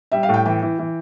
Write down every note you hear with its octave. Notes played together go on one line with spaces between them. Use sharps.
G3 E5
F5
A2
G5
E3 G5
E3
E3